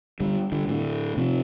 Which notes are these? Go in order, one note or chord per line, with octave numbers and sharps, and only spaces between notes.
D3 G3
D3 G3
A2 D3
C3 F3